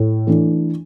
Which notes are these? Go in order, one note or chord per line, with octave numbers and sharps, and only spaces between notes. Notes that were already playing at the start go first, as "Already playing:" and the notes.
Already playing: A2
E3 A3 D4